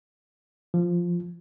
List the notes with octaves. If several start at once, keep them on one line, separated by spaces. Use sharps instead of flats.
F3